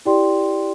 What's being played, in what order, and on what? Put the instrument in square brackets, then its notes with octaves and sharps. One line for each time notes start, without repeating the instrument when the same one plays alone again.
[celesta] E4 G4 D5 G5 C6